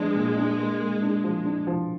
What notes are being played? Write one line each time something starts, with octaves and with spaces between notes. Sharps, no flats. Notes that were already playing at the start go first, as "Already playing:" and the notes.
Already playing: F3 G#3 B3 D4
A#2
D4
A#3
A#3
D4
F3
D4
F3